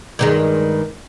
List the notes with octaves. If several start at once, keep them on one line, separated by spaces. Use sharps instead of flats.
G2 D#3 G#3